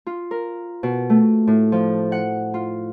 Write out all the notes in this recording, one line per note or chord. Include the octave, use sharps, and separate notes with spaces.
F4
A#4
B2
A3
A2
F3
F#5
F4